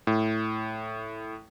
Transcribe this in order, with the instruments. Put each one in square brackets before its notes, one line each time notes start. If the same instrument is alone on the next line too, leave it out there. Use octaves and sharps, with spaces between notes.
[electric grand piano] A2